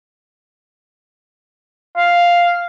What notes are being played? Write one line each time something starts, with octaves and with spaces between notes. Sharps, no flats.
F5